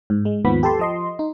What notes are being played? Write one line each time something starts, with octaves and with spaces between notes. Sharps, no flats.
G#2
G#3
D#2 G#2 F3 B3 B5
G4 A4 A5 C6
F3 D#5 C6
D#4